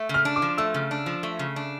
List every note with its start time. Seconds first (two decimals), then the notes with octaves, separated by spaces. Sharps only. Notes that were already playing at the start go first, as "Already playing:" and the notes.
Already playing: A3
0.09 C#3 F6
0.25 D4
0.36 D6
0.42 F3
0.58 A3 E6
0.74 C#3
0.91 D4
1.06 F3
1.23 A3
1.39 C#3
1.56 D4